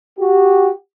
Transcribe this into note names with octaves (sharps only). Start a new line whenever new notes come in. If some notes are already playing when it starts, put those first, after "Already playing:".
F#4 G4